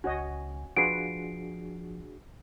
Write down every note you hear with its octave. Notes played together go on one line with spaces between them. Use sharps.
C#2 C#4 F#4 C#5 D#5 G#5
F3 D4 F4 F#4 G#4 B4 C7 D7